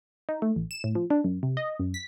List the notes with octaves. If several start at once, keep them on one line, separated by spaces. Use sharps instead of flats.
D#4
A3
A1
E7
A2
F3
D4
F#2
C3
D#5
F#2
B6